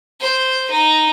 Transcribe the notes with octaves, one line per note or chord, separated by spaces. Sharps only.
C5
D#4